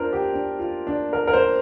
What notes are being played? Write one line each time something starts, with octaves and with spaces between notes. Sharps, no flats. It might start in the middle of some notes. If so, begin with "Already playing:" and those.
Already playing: D4 F4 A#4 C5
G4
D4
F4
D4
A#4
A#4
C5